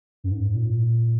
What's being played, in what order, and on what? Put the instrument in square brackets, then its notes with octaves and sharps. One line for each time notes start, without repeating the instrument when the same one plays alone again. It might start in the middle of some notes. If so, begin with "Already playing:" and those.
[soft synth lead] F#2
G#2
A#2